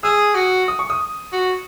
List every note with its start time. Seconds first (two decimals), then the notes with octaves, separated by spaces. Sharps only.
0.03 G#4 E6
0.35 F#4
0.68 D#6
0.79 C#6
0.90 D#6
1.32 F#4